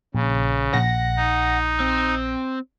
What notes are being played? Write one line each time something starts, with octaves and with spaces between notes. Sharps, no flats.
A#1 C#3
A#1 F#5 A#6
D#4
C4